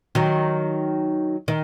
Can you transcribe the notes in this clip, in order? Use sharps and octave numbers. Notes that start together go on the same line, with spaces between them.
D#3 F#3
D#3